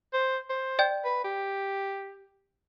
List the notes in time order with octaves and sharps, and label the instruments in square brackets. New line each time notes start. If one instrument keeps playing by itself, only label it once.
[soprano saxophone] C5
C5
[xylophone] D5 G5 G6
[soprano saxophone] B4
G4